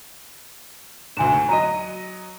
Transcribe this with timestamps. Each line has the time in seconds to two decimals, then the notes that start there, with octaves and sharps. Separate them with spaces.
1.17 D2 G#2 G#5 E7
1.49 F#3 D#5 A#5 D#7